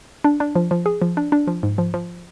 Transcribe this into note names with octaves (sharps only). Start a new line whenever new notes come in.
D4
D4
F3
F3
G#4
F3
D4
D4
F3
G#2
F3
F3